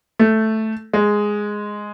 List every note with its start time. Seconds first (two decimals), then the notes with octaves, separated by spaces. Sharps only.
0.19 A3
0.94 G#3